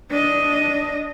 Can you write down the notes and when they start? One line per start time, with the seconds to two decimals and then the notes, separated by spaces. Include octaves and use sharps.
0.11 D4 D#5